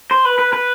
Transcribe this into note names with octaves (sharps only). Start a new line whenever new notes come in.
C5
B4
B4
B4